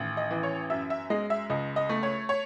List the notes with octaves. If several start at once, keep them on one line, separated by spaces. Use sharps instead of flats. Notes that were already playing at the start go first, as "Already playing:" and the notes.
Already playing: A1 D#3
D#5
E3
C#5
F#2 E5
E5
G#3 D#5
E5
C#2 D#5
D#5
A3
C#5
C#5